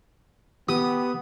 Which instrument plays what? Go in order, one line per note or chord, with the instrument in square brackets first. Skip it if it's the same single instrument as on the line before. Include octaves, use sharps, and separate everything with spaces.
[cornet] B3 [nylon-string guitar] G4 [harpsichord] D#6